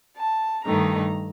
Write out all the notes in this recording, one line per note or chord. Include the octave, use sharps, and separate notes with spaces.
A5
G2 D#3 A3 D#4 A#5